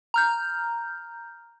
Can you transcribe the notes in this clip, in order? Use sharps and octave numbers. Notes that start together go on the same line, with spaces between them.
A#5 F6 G6